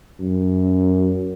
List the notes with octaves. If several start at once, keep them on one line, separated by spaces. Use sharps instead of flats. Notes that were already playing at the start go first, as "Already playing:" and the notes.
F#2